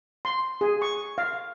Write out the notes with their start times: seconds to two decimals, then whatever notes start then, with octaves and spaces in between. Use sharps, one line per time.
0.25 C6
0.61 G#4
0.82 C#6
1.18 F5